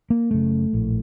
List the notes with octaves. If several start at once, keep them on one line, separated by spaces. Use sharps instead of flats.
A#3
F#1 F#2 C#3 A3
A#1 A2